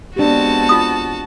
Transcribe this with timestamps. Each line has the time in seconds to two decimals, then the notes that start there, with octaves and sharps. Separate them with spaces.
0.16 G#3 B3 C4 D4 F#4 G4 A5
0.69 F4 D#6